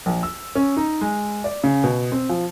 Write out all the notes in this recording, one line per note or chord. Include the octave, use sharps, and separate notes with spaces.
A#1
E6
C#4
D#4
G#3
D5
C#3
B2
C4
F3